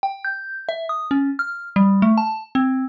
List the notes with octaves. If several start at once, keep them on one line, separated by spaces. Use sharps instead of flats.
G5
G6
E5
D#6
C#4
F6
G3
A3
A5
C4